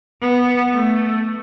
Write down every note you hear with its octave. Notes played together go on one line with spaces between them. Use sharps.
B3
A3